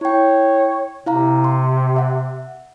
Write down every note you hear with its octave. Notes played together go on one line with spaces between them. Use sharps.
E4 C#5 G5
C3 E4 F5 A#5
C6
E5 F#5